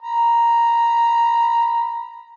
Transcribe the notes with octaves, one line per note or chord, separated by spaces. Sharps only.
A#5 B5